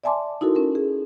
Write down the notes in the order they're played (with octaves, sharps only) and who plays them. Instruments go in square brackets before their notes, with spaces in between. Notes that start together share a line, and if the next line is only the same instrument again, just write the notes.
[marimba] D5 E5 G#5 A5 C6 D6
D#4 E4 F#4 A4 A#4
C#4 A#4
G#4